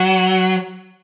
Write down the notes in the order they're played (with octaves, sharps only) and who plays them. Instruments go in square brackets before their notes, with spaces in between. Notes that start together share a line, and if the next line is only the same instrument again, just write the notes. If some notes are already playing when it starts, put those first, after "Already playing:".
Already playing: [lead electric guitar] F#3